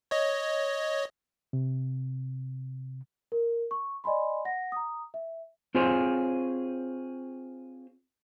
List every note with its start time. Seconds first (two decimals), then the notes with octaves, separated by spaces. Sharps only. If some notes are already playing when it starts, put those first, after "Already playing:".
0.11 C#5 D#5
1.53 C3
3.32 A#4
3.71 C#6
4.04 D5 D#5 G#5 B5 C6
4.45 F#5 A#6
4.72 A#5 D#6
5.14 E5
5.75 C4 F4 G#4 C5 C#5